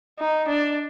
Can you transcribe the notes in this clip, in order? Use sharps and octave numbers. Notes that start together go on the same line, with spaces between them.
D#4
D4